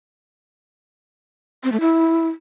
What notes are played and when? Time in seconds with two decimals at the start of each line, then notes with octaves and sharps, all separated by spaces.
1.64 C4
1.72 A3
1.80 E4